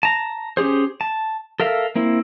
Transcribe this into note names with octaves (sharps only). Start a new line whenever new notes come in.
A5 A#5
C#4 G4 G#4 C5
A5
A4 A#4 E5 F5
A#3 C4 E4